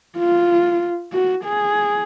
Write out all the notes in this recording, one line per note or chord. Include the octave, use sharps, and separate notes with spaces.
F4
F#4
G#4